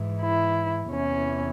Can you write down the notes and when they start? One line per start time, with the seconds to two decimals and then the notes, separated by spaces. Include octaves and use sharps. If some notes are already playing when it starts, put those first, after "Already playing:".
Already playing: G#2 E3
0.20 E4
0.91 E2 C3 E3 C#4